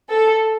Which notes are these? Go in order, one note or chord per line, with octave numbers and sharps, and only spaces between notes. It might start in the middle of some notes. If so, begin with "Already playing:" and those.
A4